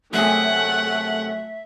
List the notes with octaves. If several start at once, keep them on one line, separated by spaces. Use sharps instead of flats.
F#2 C3 A3 G#4 E5 F#5